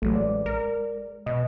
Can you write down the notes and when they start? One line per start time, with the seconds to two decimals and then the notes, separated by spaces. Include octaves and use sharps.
0.02 A1 F#3 G3 A3
0.15 G#3 D5
0.46 A#4
1.26 B2 D#5